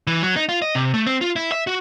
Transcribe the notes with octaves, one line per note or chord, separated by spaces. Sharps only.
E3
F#3
D#4
F4
D#5
C3
A3
C4
F4
E4
E5
F#4